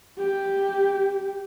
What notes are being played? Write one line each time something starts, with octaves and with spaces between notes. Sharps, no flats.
G4